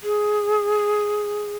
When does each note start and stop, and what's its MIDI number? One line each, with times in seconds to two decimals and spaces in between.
0.04 1.56 68